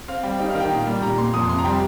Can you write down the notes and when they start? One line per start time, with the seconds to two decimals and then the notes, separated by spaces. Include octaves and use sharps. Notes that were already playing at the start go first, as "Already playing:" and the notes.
0.08 C4 F5
0.23 G3 G5
0.39 D#4 G5
0.50 D#3 F5
0.60 G5
0.71 A#2
0.87 G3
1.02 A#2 A#5
1.18 A#2 C6
1.34 F2 D#6
1.49 C3 C6
1.59 A#5
1.65 G3 G5